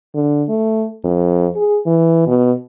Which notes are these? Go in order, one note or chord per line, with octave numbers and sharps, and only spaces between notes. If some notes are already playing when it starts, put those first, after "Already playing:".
D3
A3
F2
G#4
E3
B2